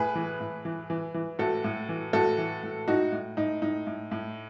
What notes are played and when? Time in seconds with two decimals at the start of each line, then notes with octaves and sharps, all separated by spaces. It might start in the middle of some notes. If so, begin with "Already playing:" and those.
Already playing: A2 G#4 B4
0.15 E3
0.40 A2
0.65 E3
0.90 E3
1.14 E3
1.39 A2 F#4 A4
1.64 A2
1.89 E3
2.13 A2 F#4 A4
2.38 E3
2.63 A2
2.88 A2 D#4 F#4
3.12 A2
3.37 A2 D#4
3.62 A2 D#4
3.87 A2
4.11 A2